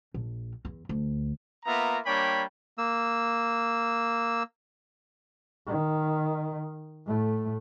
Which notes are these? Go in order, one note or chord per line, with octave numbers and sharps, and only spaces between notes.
A#1
E2
D2
A#3 B3 F4 E5 A#5
G3 A#3 D4 C#5 G5 B5
A#3 E6
D#3
A2 A3